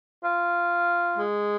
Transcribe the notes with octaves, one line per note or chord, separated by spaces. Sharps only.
F4
G#3